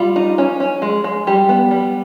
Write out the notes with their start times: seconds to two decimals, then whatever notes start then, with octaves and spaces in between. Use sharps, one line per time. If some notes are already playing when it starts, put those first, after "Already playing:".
Already playing: G3 F4
0.16 D#4
0.38 C#4
0.60 C#4
0.82 G#3
1.04 G#3
1.27 G3 G4
1.49 B3
1.71 G3